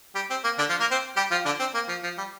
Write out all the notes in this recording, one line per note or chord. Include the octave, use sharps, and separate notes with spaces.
G3 G4
C4
A#3
D3 D4
F3 F4
A#3 A#4
C4 C5
G3 G4
F3 F4
D3 D4
C4
A#3
F3
F3
G3